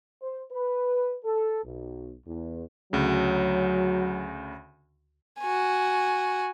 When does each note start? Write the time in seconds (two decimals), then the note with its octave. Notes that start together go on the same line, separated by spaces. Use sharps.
0.22 C5
0.52 B4
1.24 A4
1.64 B1
2.26 E2
2.93 D2 C#3 F#3
5.39 F#4 G#5